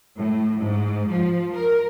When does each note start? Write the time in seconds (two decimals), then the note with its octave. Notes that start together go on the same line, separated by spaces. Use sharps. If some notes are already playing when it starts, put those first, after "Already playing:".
0.17 A2
0.60 G#2
1.09 F3
1.53 A#4